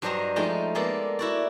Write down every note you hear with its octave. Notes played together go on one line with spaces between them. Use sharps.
G2 F#3 D4 C5 D#5 A#5
F3 G#3 A3 D#4 G5
G#3 A#3 B3 A4 D5
E4 F#4 D5